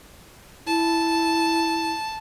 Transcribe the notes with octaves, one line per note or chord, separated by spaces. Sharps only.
E4 A5